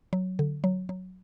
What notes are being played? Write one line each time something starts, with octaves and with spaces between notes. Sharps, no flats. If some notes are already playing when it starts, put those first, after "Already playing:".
F#3
D3
F#3
F#3